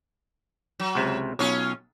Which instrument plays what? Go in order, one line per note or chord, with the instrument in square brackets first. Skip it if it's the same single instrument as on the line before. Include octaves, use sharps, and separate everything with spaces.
[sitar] F#3
[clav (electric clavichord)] C#2 C3
[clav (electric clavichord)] B1 [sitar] C#4 F4 C#5